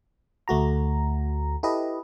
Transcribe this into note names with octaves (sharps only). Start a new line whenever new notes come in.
D2 A3 F#4 A#5
E4 G4 A4 B4 D#5